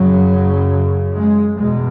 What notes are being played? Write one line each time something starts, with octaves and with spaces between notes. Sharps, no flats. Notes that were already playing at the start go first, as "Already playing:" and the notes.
Already playing: F#2 C#3 F#3
G#3
E2 B2 G#3